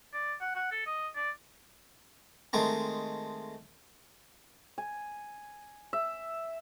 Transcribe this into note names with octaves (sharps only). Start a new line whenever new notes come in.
D5
F#5
F#5
A4
D#5
D5
D#3 G#3 A3 C4 A#5
G#5
E5